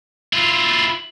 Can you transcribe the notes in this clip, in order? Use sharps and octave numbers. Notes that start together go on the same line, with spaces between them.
E4 F4